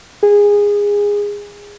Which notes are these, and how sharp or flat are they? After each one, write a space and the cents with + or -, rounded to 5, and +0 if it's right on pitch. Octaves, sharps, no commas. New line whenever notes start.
G#4 -20